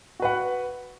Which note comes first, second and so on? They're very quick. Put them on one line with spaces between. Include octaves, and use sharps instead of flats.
F#4 B4 F#5